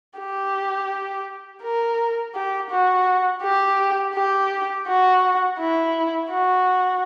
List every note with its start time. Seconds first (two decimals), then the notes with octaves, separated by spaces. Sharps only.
0.19 G4
1.63 A#4
2.35 G4
2.71 F#4
3.43 G4
4.15 G4
4.87 F#4
5.59 E4
6.31 F#4